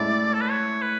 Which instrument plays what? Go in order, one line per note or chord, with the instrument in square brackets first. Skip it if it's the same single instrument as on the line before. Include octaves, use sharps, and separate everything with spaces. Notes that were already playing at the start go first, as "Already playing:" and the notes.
Already playing: [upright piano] A2 G#3 C#4 E4 A4 [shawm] D5
[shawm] A4
B4
C#5
B4